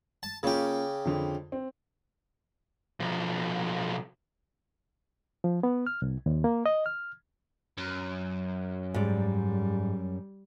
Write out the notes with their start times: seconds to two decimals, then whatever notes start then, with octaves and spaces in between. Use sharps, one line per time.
0.23 A5
0.43 C#3 A#3 C#4 F4 G4
1.05 F2 D3
1.52 C4
3.00 B1 F3
5.44 F3
5.63 B3
5.87 F6
6.02 C2
6.26 D#2
6.44 A#3
6.66 D#5
6.86 F6
7.78 F#2
8.94 G#2 G3 D5